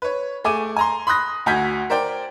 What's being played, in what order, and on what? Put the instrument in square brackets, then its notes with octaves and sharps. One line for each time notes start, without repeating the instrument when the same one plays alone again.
[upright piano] B4 C#5
A3 G#4 D6 D#7
G#5 A#5 C6
B5 C6 D#6 F#6 A#6
D2 F#4 G#5 G6 G#6 B6
A#4 C5 D5 G5